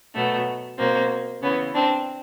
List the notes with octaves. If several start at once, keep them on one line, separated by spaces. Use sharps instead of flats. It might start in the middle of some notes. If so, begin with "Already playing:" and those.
B2 F#3 A3 B3
B2 F#3 A#3 C4
C#3 E3 B3 C#4
C4 D4